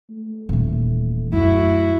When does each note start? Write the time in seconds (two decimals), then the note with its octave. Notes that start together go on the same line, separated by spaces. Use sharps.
0.10 A3
0.49 D#1 E3
1.33 F#2 E4 F#4